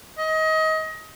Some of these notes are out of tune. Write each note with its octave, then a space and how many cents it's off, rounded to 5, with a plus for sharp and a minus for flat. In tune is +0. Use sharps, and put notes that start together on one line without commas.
D#5 +25